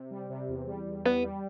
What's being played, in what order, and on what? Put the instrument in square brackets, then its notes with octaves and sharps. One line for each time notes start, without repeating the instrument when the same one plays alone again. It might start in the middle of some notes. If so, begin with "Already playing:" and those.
Already playing: [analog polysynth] C3
G3
C3
E2
G3
E2
[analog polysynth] G3 [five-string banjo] B3
[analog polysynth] G3